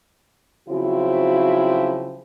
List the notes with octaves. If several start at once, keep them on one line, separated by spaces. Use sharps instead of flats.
C#3 F3 F#3 C4 E4 F#4